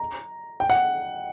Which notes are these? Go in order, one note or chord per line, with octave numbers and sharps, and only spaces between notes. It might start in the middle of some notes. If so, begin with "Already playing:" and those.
Already playing: A#5
G5
F#5